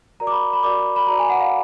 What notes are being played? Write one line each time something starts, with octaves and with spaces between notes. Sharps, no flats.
F#4 A#4 D5 A#5
D6
B5
B5
F#4 A#4 D5 D6
B5
F#4 A#4 D5 A#5
G#5
F#5
F5